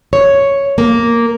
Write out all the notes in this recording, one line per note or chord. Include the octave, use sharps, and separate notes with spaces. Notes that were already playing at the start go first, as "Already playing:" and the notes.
C#5
A#3